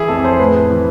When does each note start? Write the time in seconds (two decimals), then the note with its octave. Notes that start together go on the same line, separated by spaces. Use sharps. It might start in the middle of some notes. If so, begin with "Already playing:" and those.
Already playing: E3 E4 G#4
0.08 F2 A4
0.25 C5
0.40 A2 B4
0.71 E3